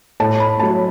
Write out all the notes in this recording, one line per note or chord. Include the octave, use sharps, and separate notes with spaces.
A2 A5
B5
F#3 A3 A5